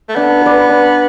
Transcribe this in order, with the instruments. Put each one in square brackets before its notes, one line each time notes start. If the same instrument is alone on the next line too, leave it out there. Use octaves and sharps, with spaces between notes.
[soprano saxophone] A3
[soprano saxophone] B3 [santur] D4
[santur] B4 D5
D4